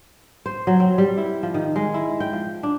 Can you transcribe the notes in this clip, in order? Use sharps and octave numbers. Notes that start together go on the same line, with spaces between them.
C5
F#3
C4
G3
E4
F3
D#3
G#3
E4
G5
F3
D4